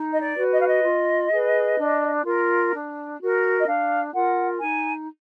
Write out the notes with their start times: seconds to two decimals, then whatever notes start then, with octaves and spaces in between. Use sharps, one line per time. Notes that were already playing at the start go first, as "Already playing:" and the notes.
Already playing: D#4
0.13 D#5
0.21 D5
0.37 F#4 B4
0.52 D#5
0.60 F5
0.67 D#5
0.84 F4
1.31 G#4 B4
1.78 D4
2.25 F4 A#4
2.73 D4
3.20 F#4 A#4
3.61 D#5
3.67 D4 F5
4.14 F4 A#4 F#5
4.61 D#4 G#5